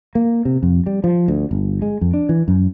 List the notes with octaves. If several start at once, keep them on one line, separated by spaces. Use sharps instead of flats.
A#3
C3
F2
G3
F3
D2
G1
G#3
F2
D4
E3
F#2